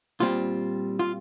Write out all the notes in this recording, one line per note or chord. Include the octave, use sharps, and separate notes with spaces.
A#2 G3 C4 F4
F4